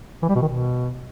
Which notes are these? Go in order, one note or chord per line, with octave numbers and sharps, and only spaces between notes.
E3
G3
B2
D#3
B2